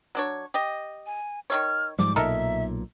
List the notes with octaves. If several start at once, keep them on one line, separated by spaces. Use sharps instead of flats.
F#3 D4 C#5
G4 D#5
G#5
D#3 G#3 C#5 F6
G#2 F3 G3 D6
B1 A#2 D#4 A4 A#4 E5